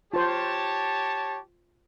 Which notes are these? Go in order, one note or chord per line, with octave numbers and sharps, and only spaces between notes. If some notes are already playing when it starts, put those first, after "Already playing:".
F4 G4 C5 C#5 A5